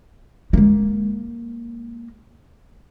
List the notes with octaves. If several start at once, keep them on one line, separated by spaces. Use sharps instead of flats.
G#3 A#3